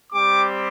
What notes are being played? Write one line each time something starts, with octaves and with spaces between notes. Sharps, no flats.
G3 C4 G4 D6